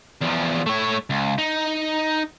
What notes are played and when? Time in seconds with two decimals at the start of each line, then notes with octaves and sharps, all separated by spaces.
0.21 E2 F3
0.66 A3 C#5
1.10 C#2
1.38 D#4